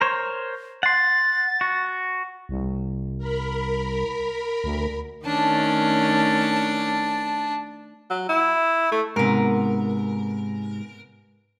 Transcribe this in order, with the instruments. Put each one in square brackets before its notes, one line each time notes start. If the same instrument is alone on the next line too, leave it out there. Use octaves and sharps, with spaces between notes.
[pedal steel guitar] A#4 C5 C#5
[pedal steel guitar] F#5 C6 [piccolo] A6
[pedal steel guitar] F#4
[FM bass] C2
[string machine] A#4 B5
[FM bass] D2
[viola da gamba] D#3 A3 C#4 [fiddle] D4 A5
[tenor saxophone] F#3
E4
A3
[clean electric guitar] G#2 C3 [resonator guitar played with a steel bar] B3 A#4